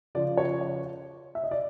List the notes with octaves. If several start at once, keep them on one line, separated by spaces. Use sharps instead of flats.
C#3 F3 D5
C#5
C#5
E5
D#5
D5